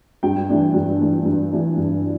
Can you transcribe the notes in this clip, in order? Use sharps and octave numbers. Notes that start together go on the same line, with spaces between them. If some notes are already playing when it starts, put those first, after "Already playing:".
G2 G5
E3 A3 D4
G2
E3 A3 D4
G2
E3 A3 D4
G2